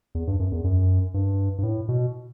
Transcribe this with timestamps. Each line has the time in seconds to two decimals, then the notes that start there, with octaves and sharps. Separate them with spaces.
0.15 E2
0.27 G2
0.40 F#2
0.52 E2
0.64 F#2
1.14 G2
1.58 G2
1.63 A2
1.89 B2